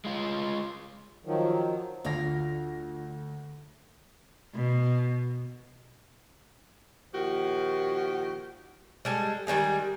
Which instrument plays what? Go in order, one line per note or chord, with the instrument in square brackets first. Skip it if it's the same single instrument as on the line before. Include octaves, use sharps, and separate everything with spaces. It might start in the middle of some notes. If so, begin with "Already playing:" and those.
[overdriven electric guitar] G#3 F4
[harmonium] D#3 F3 F#3
[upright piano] D2 A#6 [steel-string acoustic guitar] D3 F4 F5
[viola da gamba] B2
[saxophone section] A#2 D#3 F3 F#4 G4
[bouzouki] G3 G#3 A4
D#3 G3 G#3 G#4